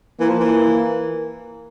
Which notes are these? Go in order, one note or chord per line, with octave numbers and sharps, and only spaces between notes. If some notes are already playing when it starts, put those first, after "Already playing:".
E3 A#3
F3
E3